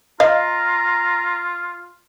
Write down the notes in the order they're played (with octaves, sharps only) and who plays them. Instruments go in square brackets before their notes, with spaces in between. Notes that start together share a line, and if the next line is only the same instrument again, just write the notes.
[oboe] F4 [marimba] D#5 [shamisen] F5 [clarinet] A#5